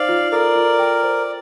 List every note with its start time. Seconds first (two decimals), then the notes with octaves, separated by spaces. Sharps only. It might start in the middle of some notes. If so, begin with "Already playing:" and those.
Already playing: D#4 C5 D5 F5
0.09 F4
0.32 A4 A#4 D5
0.56 F4
0.79 G5
1.03 C5